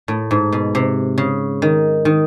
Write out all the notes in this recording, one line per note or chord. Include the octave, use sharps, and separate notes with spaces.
A2
G#2
B2
C3
C#3
D#3
D#3